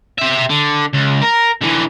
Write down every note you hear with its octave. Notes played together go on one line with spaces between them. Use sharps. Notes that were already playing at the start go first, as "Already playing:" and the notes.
G4 E5
D3
C#2
A#4
D3 E3